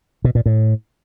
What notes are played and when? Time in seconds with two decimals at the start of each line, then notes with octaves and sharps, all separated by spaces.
0.24 B2
0.35 A#2
0.46 A2